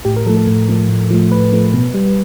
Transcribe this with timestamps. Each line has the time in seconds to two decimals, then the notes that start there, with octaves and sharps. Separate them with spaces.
0.05 A2 G4
0.16 A#4
0.26 F3 A4
0.29 A3
0.37 A4
0.47 A2
0.69 F3 A3
0.89 A2
1.11 F3 A3
1.31 A2 B4
1.52 F3 A3
1.73 B2
1.94 G3